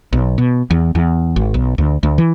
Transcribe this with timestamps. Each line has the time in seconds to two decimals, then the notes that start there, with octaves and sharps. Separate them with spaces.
0.13 B1
0.38 B2
0.70 E2
0.95 E2
1.36 G#1
1.54 B1
1.78 D2
2.03 D2
2.18 E3